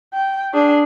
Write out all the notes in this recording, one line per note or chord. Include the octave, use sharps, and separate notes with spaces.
G5
D4 G#4